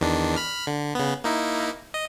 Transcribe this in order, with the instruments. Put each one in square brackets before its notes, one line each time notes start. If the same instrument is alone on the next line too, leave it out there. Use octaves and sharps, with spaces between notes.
[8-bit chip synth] E2 D#3 D4
B5 F6
D3
C#3 B3
A#3 D#4 E4
D#5